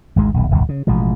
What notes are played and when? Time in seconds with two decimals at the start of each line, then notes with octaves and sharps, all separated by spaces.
0.16 G#1 D2 G#2 G#3
0.34 D#1 B1
0.50 D1 G1 C2
0.69 C#3
0.87 A1 B2 F3 G#3